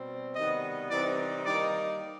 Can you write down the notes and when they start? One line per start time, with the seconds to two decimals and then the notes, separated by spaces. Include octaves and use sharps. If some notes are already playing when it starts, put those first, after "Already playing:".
Already playing: B2 G3 C4
0.35 C3 D#3 G3 B3 D#5
0.90 C3 E3 G3 C4 D#4 D5
1.45 D#3 G3 A#3 D#4 D5